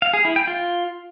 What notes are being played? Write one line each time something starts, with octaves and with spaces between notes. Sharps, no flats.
F5
G#4
E4
G5
F4